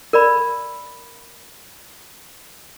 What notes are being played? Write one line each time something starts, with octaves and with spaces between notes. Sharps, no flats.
A#4 D5 B5